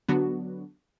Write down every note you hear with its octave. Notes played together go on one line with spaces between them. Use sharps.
D3 F#3 B3 D4 F#4